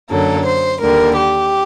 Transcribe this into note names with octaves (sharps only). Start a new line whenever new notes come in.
F#2 D3 F#3 A#3 A4
C5
D#2 D3 G3 A#4
G4